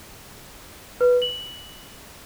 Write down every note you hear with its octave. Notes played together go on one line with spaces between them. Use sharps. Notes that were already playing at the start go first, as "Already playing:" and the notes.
B4
F#7